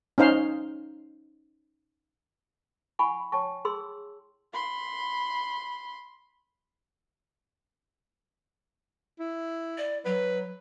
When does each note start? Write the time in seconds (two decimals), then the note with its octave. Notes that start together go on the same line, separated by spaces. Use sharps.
0.18 C#4 D#4 C5 F5
2.99 E4 F#5 G#5 B5 C#6
3.32 C#5 G5 A5 C#6
3.65 G#4 C6 E6
4.54 B5 C6
9.19 E4
9.78 D5
10.05 F#3 B4